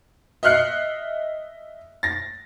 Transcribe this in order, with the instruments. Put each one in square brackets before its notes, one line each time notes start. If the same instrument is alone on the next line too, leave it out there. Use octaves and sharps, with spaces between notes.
[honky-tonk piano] D#5 E5 F6 F#6 C7 C#7
A6 A#6